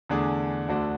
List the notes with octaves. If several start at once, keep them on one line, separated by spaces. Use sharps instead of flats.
E2 D3 A3 D4 G#4
D2 D3 A3 D4 F#4